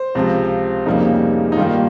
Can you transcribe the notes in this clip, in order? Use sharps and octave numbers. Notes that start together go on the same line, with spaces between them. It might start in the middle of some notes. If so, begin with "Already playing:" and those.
Already playing: C5
C#2 C3 F3
F1 F2 C#3 G3 A#3 D#4
D#4
G2 D#3 G3 A#3 F4